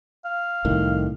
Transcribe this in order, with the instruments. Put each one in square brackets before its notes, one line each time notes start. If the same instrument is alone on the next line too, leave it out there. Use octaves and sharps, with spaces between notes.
[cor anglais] F5
[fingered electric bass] C2 A2 D#3